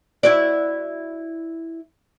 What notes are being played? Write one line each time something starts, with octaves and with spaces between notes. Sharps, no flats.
E4 F#4 D5